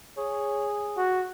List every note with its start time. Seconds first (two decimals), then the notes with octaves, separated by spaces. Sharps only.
0.18 G#4 C#5
0.97 F#4